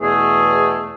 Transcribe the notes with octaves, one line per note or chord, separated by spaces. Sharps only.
E2 B2 A3 G#4